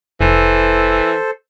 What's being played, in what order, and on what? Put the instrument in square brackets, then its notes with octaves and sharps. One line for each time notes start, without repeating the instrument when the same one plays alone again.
[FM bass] F1 [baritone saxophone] E3 [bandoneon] A4 C5